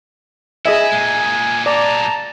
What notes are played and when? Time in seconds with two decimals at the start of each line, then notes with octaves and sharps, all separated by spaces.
0.66 E4 G#4 D#5 E5 G#5
0.92 A#2 G#3
1.66 D5 A5 A#5